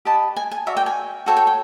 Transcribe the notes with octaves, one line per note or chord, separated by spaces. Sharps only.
G4 B4 D#5 A5
G#5
G#5
F#4 A#4 D5 E5
G5
G#5
F#4 A4 C#5 G5
G5
G5